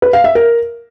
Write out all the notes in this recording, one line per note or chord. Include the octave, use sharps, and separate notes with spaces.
B4
F5
E5
A#4